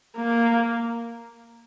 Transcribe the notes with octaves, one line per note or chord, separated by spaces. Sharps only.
A#3